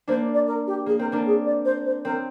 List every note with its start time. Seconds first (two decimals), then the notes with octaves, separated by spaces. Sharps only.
0.07 A#3 D4 C5
0.34 D5
0.47 A#4
0.67 G4
0.86 A#3 G#4
0.99 C4 A#4
1.12 A#3 D4 A#4
1.26 G#4
1.45 D5
1.65 C5
1.85 C5
2.04 C4 A#4